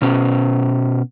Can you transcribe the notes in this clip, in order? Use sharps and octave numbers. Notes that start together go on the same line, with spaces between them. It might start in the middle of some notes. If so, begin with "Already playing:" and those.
B2 C#4